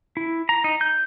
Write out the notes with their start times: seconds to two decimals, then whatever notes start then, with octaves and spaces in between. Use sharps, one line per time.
0.17 E4
0.49 A#5
0.64 D#4
0.81 G6